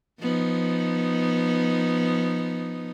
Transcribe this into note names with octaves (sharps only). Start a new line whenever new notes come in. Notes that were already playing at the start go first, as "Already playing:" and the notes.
F3 B3 D#4